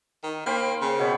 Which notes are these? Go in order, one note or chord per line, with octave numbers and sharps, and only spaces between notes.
D#3
A#3 C5 G5 B5
C#3
B2 C#5 B5